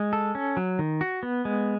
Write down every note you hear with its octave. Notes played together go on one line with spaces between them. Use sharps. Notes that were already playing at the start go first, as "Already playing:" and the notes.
Already playing: G#3
A4
C#4
F#3
D#3
F#4
B3
G#3